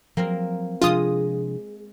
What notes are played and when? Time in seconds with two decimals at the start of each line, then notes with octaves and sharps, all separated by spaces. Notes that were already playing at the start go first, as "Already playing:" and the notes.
0.17 F3 F#3 A#3 C4 A#4
0.82 C3 F3 G#3 D4 F4 D#6